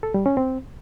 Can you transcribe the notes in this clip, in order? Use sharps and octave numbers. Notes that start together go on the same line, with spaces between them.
A4
G3
C#4
C4